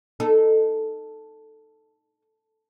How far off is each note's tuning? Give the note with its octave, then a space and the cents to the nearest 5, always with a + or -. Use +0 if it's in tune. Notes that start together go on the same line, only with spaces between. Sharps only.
D#4 -15 A4 +0